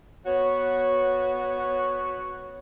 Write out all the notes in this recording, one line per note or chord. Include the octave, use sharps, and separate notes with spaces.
B3 F#4 C#5